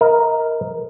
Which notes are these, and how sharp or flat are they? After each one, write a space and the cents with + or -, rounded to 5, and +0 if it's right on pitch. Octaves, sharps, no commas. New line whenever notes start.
A#4 +0 D#5 +25